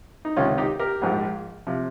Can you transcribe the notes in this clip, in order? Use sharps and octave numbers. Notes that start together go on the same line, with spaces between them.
D#4
C#2 C3 D#3 C#4 F4
D#4 G4
G4 A#4
A#1 G#2 F3
C3 F3